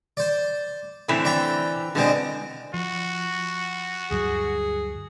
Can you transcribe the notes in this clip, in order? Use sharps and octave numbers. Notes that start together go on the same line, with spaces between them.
C5 D5
A2 D3 E3 C4
D5 G5 A#5
B2 D3 G#3 C4 D4
F3 F#4
D2 G2 F#3 G#4